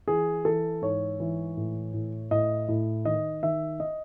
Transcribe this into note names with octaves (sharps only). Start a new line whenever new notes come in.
E3 G#4
E3 A4
G#2 C#5
E3
A2
A2
A2 D#5
A2
D#3 D#5
D#3 E5
D#5